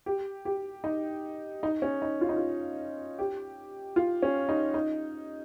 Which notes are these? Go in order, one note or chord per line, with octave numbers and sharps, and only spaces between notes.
G4
G4
D#4
D#4
C#4
D#4
F4
D#4
F4
G4
F4
C#4
D#4
D#4